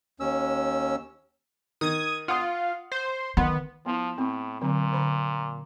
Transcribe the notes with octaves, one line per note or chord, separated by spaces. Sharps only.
D#2 C#4 E6
D#3 D#6 G#6
F4 F#5 D#6
C5
D#3 B3 C6
F3 B3 E4
A2 C4
A#2 D3 F#3 C4
D3 C5 B5